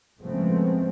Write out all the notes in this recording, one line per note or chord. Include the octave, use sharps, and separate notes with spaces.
C#3 F3 G#3 A3 B3 C4